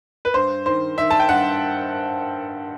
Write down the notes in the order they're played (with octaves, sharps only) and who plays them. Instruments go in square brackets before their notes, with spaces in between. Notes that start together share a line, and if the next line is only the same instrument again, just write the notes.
[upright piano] B4
G2 C5
D#3 C5
D#3 E5
A5
G5
G2 F#5